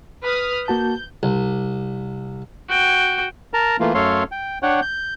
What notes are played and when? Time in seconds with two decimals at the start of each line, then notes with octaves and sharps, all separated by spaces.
0.24 B4 D#6 F6
0.68 A#3 F#4 A5 G6
1.23 C2
2.69 F#4 G5
3.54 A#4 A5 A#5
3.80 E3 A3 A#3 F4
3.95 F#2 A3 A4 C#5 F5 C6
4.31 G5
4.63 D4 C#5 F#5 G5
4.82 G6